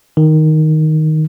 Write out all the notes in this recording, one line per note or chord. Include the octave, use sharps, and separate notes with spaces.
D#3